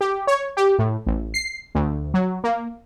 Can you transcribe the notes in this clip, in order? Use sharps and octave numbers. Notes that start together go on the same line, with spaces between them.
G4
C#5
G4
A2
A1
C7
D2
F#3
A#3